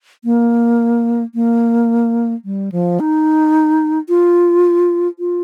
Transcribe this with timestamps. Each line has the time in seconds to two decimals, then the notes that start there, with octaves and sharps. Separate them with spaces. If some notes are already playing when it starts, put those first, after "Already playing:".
0.24 A#3
1.35 A#3
2.45 G3
2.72 F3
3.00 D#4
4.09 F4
5.19 F4